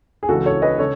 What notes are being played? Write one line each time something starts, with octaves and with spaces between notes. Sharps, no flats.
G#4
C#2 C#3 E3 F#4 A4
A4 C#5
B4 D#5
C#3 A4 C#5